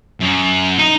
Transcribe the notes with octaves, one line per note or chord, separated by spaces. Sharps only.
F#2
D#4